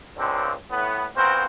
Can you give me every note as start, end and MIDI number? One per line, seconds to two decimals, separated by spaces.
0.17 0.52 37
0.17 0.52 50
0.17 0.52 60
0.71 1.05 45
0.71 1.05 59
1.15 1.44 46
1.15 1.44 59
1.15 1.44 60
1.15 1.44 66
1.15 1.44 70
1.15 1.44 72